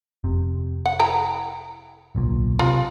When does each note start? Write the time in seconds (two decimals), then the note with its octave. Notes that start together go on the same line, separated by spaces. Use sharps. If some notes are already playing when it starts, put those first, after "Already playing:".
0.24 F1 C3
0.86 F#5
0.99 E4 G5 A#5
2.15 D1 B1 A#2
2.59 C3 F4 F#4